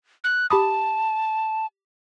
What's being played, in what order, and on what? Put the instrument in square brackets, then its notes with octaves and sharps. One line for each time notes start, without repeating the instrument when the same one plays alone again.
[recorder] F#6
[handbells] G4 B5 D#6 [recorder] A5